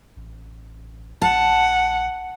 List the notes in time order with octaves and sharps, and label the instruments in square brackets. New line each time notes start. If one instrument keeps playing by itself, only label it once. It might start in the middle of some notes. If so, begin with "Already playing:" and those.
[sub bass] A1
[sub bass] A#1 [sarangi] F#5 [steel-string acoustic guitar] A5